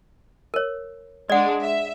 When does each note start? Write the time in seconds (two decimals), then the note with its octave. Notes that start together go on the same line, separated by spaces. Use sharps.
0.54 A#4 C#5
1.30 G#3 D4 D5 F#5
1.62 E5